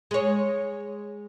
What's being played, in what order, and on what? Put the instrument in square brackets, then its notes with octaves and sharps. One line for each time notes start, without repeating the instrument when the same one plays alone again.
[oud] G#3 C#5